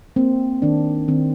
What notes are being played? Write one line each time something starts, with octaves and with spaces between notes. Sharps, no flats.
A#3 C4
D#3 D4
D#3 C4